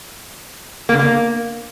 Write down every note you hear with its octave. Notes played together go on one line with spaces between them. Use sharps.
A#3
D3
A#3